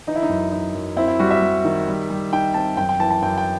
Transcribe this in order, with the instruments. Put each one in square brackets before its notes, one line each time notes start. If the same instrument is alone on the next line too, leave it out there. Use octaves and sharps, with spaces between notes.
[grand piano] E3 D#4
E4
D#4
F#2
D#4
F#2
C4 E4
E4
G3 F#4
E5
G3
D#3
G3
G3
D#4 G5
C4 A5
F#2 G5
G5
E3 A5
A5
F#2 G5
G5